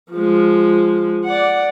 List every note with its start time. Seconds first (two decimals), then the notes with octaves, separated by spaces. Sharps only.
0.12 F3 G#3
1.24 D5 F#5